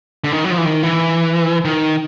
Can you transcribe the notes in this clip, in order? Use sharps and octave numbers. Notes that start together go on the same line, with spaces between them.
D3
D#3
F#3
F3
E3
D#3
E3
D#3